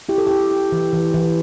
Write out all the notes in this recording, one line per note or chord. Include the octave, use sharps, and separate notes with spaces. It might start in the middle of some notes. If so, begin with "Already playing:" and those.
E4 G4
A4
E4 G4
E4
E3
E3
E3